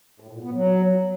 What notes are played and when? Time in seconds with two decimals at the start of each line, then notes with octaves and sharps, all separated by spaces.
0.20 A2
0.31 A#2
0.43 B3
0.54 F#3